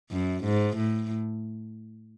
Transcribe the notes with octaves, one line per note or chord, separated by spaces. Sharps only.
F#2
G#2
A2